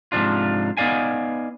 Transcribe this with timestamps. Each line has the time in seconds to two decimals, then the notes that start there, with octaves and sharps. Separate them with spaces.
0.12 G#2 C3 E3 F3 D4 F4
0.77 B3 D#4 D5 F5 G#5